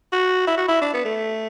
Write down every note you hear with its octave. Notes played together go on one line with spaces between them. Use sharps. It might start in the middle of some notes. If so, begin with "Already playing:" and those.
F#4
E4
F#4
E4
D4
B3
A3